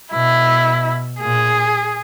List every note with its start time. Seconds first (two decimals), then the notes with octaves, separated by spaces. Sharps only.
0.13 B2 E4
1.21 A#2 G#4